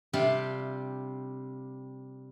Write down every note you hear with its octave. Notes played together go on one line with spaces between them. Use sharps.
C3 G3 D4 F4 G4 F5